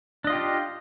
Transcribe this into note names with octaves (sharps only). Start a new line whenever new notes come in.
D4 F4 G4 D#5